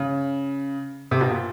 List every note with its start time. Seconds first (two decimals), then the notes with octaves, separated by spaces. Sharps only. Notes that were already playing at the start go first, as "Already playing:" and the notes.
Already playing: C#3
1.11 C3
1.21 B2
1.30 A#2